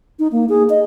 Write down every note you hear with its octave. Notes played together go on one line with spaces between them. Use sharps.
D#4
A#3
G#4
D#5